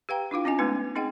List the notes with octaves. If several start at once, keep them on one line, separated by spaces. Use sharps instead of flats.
G4 B4 F5 G5 A#5
D4 E4 F4 F5
C4 C#4 F4 D#5 G#5
G#3 A3 B3 D#4 B4
C4 D#4 G#4 D#5 F#5 G5